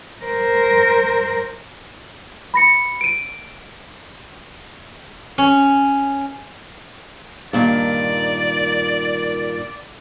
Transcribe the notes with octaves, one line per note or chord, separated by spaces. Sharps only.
A#4 C5
B5 A#6 C#7
D7 D#7
C#4
G2 A#2 D#3 D5